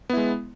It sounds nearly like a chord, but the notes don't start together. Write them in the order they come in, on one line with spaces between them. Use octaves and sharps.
B3 E4 G#3